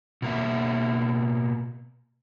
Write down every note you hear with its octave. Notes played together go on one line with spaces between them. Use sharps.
B2 A#3 E5